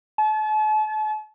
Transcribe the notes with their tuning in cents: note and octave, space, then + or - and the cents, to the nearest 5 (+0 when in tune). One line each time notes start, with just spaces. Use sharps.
A5 -40